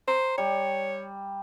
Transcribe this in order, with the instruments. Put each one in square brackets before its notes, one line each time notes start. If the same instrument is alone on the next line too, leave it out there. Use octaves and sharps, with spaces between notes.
[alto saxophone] C5 [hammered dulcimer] A#5
[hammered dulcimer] G3 [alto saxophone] C#5